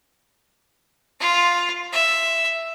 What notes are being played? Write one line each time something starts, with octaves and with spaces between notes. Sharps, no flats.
F4
E5